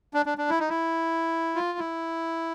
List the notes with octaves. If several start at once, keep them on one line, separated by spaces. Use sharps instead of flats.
D4
D4
D4
E4
D#4
E4
F4
E4